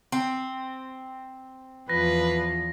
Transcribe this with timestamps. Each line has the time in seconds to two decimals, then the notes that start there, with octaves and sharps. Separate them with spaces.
0.12 C4
1.90 E2 F3 B4 A#6